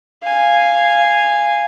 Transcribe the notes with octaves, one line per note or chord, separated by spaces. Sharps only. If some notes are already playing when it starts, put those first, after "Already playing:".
F5 G#5